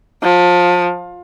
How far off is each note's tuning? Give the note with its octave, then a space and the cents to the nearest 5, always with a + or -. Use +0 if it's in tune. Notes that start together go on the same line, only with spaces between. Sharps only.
F3 +25